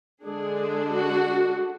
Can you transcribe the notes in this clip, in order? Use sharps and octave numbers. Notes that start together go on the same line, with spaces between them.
D3 G#3 D4 G#4
F#4